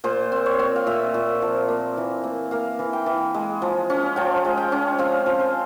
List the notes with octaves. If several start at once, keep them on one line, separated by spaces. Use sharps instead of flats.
A#2 C5
C4
C#5
C4
F5
A#2 E5
A#2
F3
A#3
E3
A#3
A#3 F5
E3
G5
E3
G#3
F3
C#4
F3 G5
G#3
G5
C#4
C4 F5
F3
C5